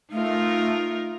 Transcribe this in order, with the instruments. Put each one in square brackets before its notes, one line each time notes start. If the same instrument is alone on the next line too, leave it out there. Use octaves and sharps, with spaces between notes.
[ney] A3 [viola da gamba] D#4 F4 A#4